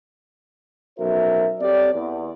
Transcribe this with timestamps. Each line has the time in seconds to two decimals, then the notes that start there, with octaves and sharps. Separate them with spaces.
0.98 B1 F#2 F#4 A#4 C5 E5
1.61 C4 G4 A4 C#5 D5
1.93 E2